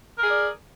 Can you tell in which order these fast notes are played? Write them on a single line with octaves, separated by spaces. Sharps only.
A#4 G#4 D5